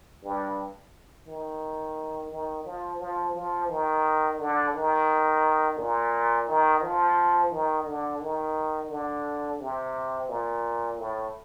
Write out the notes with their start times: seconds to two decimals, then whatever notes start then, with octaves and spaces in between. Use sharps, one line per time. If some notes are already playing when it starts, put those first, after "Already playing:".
0.24 G2
1.28 D#3
2.32 D#3
2.66 F3
3.01 F3
3.35 F3
3.70 D#3
4.39 D3
4.74 D#3
5.78 A#2
6.48 D#3
6.82 F3
7.52 D#3
7.86 D3
8.21 D#3
8.91 D3
9.60 C3
10.29 A#2
10.98 A2